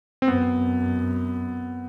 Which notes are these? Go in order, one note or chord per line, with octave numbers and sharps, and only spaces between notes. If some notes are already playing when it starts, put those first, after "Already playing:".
C4
F#2 B3